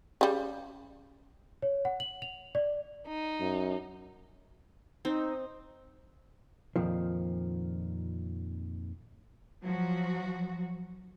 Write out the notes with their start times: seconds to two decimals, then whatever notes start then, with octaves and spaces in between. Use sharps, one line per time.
0.21 C#3 G3
1.62 C#5
1.85 F#5
2.00 F#7
2.22 F7
2.55 D5
3.07 D#4
3.40 F#2
5.05 C4 D#4
6.76 F2 A#2 D#3 F3
9.63 F3 F#3 F#4